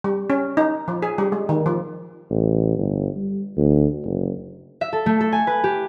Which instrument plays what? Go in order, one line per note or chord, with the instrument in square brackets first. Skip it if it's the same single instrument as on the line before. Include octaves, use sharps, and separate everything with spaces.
[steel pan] G3
C#4
D#4
F3
G#4
G3
G#3
D#3
F3
[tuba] A1
G1
G3
D2
F#1
[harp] E5
A4
A3
A4
G#5
B4
G4